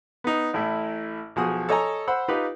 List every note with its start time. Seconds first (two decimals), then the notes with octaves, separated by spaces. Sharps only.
0.24 B3 D#4
0.53 A1 A2 E4
1.36 B1 F3 F#4 G#4 D#6
1.69 A4 C#5 D#5 G#5 A#5
2.07 C5 F#5 B5 E6
2.28 D#4 F4 G4 B4